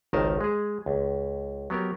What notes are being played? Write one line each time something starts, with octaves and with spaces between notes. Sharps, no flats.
G#1 C#2 D#3 A#4 D#5 A5
G#3 G#4
C#2
F#3 B3 G4 A#4